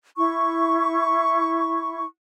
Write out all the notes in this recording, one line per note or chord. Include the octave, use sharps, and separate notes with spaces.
E4 C#6